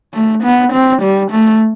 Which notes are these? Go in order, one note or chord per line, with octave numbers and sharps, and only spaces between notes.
A3
B3
C4
G3
A3